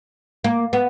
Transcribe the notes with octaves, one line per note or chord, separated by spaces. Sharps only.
A#3
B3